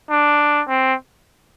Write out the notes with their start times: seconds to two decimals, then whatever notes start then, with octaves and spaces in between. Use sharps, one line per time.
0.10 D4
0.68 C4